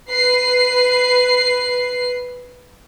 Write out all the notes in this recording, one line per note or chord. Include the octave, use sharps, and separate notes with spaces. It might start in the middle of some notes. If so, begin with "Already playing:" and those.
B4 C7